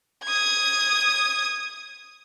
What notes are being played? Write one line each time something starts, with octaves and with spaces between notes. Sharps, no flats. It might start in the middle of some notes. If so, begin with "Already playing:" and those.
D#6 G#6